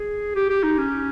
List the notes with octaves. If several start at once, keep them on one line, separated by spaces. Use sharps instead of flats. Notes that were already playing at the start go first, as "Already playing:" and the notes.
Already playing: G#4
G4
G4
D#4
C#4